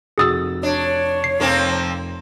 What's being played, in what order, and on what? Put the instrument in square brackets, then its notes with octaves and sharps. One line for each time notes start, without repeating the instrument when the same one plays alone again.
[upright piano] F1 F#4 A6 [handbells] G#4 D#6 E6
[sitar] D4 [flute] C#5
[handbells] C7
[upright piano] F1 [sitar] F3 A#3 C4